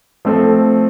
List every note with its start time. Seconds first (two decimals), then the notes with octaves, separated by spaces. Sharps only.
0.25 F3 A3 C4 A4